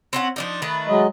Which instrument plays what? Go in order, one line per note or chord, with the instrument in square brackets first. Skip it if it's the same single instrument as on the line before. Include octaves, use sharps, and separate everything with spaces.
[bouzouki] C4 C#4 F#5
F3 D4 D#4
D#3 A3 B4
[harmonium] F#3 G#3 D#5